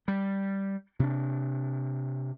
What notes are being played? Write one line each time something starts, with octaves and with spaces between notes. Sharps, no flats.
G3
C3 D4